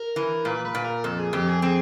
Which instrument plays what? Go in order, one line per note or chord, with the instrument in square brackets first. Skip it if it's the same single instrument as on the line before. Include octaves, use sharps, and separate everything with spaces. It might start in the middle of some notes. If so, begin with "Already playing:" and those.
Already playing: [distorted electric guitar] A#4
[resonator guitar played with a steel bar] E3
[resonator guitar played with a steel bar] A#2 [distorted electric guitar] B4
[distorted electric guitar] B4
[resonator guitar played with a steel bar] A#2
[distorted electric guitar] A#4
[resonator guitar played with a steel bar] F2 [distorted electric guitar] A4
[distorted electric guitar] G#4
[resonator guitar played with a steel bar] F2 [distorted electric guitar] G4
[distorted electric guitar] G#4
[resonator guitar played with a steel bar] C4 [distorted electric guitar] G#4